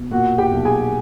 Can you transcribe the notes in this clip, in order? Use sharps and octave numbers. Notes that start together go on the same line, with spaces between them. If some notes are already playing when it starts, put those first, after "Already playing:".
Already playing: B2
A#2 F#4 F#5
G4 G5
B1
G#4 G#5